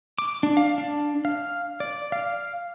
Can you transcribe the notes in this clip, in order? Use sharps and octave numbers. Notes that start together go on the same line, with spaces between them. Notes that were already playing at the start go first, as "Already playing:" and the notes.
D6
D4
F5
D4
F5
D5
F5